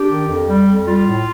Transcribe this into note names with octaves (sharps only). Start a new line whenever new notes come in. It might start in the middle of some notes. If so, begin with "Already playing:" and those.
Already playing: D4 G4
D#3
F2
G3
F2
G3 F4
A2